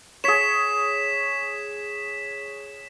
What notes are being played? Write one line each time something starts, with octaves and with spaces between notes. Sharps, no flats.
G#4 C#5 B6 E7